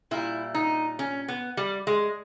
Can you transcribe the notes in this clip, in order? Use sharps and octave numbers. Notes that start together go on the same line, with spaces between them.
A#2 G3 E4
D#4
C#4
B3
G3
G#3